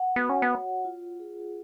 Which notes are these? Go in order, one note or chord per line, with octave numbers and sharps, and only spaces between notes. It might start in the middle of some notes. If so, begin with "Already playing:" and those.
Already playing: F#5
B3 F#4
C#4
B3
C#5
F4
G#4